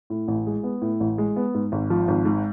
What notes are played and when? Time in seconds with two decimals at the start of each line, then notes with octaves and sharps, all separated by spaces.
0.10 A2
0.28 A1
0.47 G#3
0.63 B3
0.82 A2
1.00 A1
1.18 G#3
1.36 B3
1.54 G#2
1.72 G#1
1.90 F3
2.08 G#1
2.25 G#2